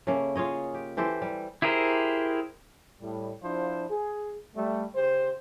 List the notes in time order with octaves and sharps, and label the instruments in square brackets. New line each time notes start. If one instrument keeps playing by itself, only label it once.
[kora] C#3 A3 A#3
F4 G#4 C#5 D#5
G4
E3 G4 A4 C5
G3
[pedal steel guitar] E4 G4 G#4 A#4 C5
[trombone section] A2 G3
F3 D4 E4 F4 C5
G#4
G3 A3
C#3 G4 C5